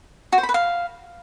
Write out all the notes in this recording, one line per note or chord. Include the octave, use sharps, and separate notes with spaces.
F#4
C5
B5
B4
F5